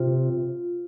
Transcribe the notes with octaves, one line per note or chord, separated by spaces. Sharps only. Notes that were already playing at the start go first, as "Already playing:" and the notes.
Already playing: C3 F4